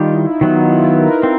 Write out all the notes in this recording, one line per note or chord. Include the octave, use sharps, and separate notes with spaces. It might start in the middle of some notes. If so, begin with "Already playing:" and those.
Already playing: D#3 G3 D#4 F4 G4
E4
D#3 F#3 B3 D#4
F4
E4
B4
A#4
C4